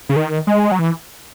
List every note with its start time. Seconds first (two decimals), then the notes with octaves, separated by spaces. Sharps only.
0.09 C#3
0.16 D#3
0.47 G#3
0.72 F#3
0.79 E3